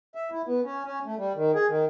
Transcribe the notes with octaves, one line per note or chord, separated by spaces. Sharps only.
E5
E4
B3
C#4
C#4
A3
G3
D#3
G#4
D#3